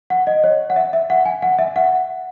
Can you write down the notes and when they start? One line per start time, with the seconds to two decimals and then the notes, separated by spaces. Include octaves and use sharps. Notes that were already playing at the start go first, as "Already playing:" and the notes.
0.10 F#5
0.27 D#5
0.44 C#5
0.70 F#5
0.76 E5
0.93 E5
1.10 F#5
1.25 G#5
1.42 F#5
1.59 E5
1.76 F#5